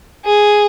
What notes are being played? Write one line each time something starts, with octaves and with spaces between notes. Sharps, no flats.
G#4